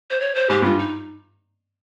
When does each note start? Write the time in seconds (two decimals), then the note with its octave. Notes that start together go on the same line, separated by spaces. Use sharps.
0.10 C5
0.20 C#5
0.35 C5
0.50 G#2 G4
0.62 G2 F4
0.79 D#4